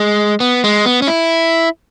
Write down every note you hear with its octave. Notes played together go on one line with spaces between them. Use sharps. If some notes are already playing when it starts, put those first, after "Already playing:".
Already playing: G#3
B3
G#3
B3
C#4
E4